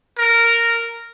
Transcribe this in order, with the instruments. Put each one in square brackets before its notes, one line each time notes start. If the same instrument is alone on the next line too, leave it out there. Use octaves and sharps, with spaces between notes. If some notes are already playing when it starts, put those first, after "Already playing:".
[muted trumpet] A#4